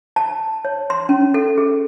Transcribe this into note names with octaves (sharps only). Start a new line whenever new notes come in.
A5
C#5
C6
C#4
A4
G#4